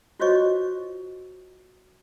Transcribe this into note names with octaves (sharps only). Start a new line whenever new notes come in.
F4 F#4 C5 C#5 D#5 C#6